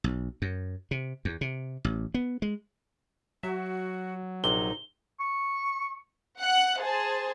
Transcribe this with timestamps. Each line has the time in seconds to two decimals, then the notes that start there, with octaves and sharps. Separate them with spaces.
0.04 B1
0.42 F#2
0.91 C3
1.25 E2
1.41 C3
1.85 A1
2.14 B3
2.42 G#3
3.43 F#3 F#4 E5
4.44 A#1 C3 D#4 G7
5.20 C#6
6.40 F#5 F#6
6.80 G#4 C5 A5